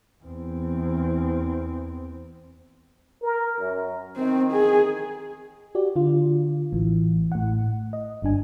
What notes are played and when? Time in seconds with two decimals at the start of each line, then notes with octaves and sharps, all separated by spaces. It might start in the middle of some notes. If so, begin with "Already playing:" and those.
0.24 E2 C4
3.22 A#4
3.60 F#2
4.17 D#3 C4
4.52 G#4
5.75 F#4 G4 D5
5.96 D3 F4
6.73 A1 A2 E3
7.32 A2 F#5
7.93 D#5
8.22 G1 G2 D4 G#5